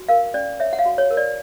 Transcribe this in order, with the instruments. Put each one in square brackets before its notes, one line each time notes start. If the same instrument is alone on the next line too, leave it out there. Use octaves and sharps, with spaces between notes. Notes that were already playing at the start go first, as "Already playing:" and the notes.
Already playing: [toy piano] F#4
A#4 F5
C#4 D5
C#5 E5
F#5
F5
F#4
C#5
A#4
D5